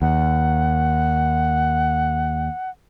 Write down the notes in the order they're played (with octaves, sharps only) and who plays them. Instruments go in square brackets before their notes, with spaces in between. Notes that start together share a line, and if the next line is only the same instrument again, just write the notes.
[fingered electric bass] D#2 [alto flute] F#5